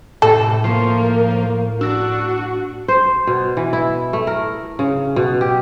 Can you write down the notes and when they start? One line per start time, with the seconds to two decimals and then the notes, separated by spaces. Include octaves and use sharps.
0.22 A2 C3 A4
0.64 F3 A#3 A#4 C#5 C6
1.81 D4 F#4 E6 A#6
2.88 C5
3.27 B2
3.57 E3
3.73 E4
4.13 A3
4.27 A#4
4.79 C#3
5.16 B2
5.41 G4